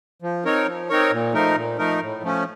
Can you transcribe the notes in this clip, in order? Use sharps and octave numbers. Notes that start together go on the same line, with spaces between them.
F3
C4 D#4 A#4 C#5
F3
C4 D#4 A#4 C#5
A#2
F3 A3 D#4 A#4
A#2
F3 A3 D#4 A#4
A2
F3 A3 C#4